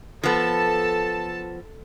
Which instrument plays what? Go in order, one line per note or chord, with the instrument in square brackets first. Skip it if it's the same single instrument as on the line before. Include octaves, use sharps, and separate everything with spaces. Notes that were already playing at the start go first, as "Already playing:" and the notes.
[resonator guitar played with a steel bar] F3 B3 [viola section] A4 A5